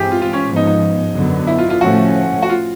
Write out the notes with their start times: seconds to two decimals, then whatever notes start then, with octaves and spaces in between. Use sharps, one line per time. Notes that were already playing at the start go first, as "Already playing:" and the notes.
Already playing: G2 E3 G#3 C4 G4 G#4
0.12 F4
0.22 F4
0.33 C#4
0.45 G#2 F3 G#3 B3
0.56 D#4
0.67 D#4
1.13 F#2 D3 F#3 B3
1.47 E4
1.58 F4
1.70 F4
1.81 A2 F3 A3 C#4 F#4
2.43 F#4
2.49 F4